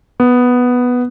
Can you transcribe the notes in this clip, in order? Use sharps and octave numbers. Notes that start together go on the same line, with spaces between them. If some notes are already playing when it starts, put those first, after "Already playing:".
B3